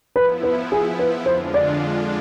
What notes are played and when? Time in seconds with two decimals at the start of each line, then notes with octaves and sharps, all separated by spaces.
0.16 F3 B3 E4 B4
0.43 B4
0.72 G#4
0.99 B4
1.26 F2 D3 G#3 D4 F4 C5
1.54 D5